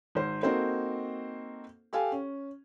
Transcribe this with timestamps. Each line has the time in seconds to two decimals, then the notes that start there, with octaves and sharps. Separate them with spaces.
0.15 G#1 C5
0.43 A#3 C4 D#4 F#4 A4 C5
1.93 G4 A4 F5 G#5
2.12 C#4